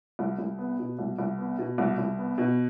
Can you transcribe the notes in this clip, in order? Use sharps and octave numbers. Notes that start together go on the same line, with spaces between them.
C2
C2
B3
B2
C2
C2
B3
B2
C2
C2
B3
B2